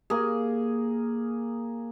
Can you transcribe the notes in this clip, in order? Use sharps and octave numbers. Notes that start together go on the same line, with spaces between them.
A#3 G#4